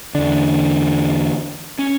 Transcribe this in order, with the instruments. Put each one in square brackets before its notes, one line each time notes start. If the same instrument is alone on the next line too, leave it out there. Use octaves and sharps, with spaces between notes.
[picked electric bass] E2 D3 D4
C#4